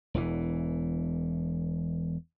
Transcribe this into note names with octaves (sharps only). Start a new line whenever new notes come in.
E1 E2 E3